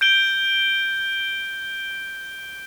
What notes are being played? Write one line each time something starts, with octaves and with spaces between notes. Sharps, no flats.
G6 D7 G7